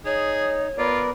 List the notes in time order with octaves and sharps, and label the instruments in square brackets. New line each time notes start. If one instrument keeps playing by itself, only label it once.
[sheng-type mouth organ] D#4 [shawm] G#4 [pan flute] C#5
[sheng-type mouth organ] B3 A#4 D5 [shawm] F4